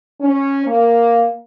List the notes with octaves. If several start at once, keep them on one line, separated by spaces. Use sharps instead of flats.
C#4
A#3